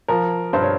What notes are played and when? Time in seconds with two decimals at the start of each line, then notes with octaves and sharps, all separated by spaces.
0.08 F3 A#4
0.53 G2 C5
0.63 C#5